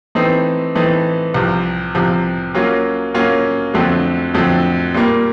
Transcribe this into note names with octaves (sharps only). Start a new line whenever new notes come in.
E3 A3 C4 D#4
E3 A3 C4 D#4
C2 C3 F3
C2 C3 F3
F#3 A#3 C#4 F4
F#3 A#3 C#4 F4
F2 D3 F#3 A3 C4
F2 D3 F#3 A3 C4
A#2 G3 A#3